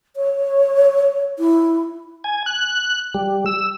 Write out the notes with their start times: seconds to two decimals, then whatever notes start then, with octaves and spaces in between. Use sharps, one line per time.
0.16 C#5
1.39 E4
2.24 G#5
2.46 F#6
3.15 G3
3.46 E6